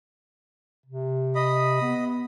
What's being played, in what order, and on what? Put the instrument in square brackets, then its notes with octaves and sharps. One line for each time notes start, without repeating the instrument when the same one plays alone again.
[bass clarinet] C3
[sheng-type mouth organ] D#5 B5
[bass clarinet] B3